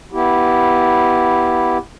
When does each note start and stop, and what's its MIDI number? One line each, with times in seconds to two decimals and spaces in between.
0.13 1.78 59
0.13 1.78 64
0.13 1.78 67